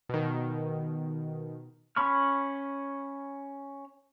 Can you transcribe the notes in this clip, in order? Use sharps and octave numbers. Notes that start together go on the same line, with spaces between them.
B2 D#3
C#4 B5 C#6 F6